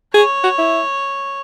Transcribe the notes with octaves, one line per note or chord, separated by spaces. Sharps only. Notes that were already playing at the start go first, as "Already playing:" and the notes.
G#4 C#5
F#4
E4